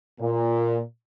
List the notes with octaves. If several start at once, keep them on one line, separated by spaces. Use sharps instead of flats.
A#2